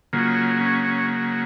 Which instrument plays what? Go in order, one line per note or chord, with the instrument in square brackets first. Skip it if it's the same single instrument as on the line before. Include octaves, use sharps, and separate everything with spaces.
[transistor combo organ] C#3 F#3 A#3 F4
C#4
C#4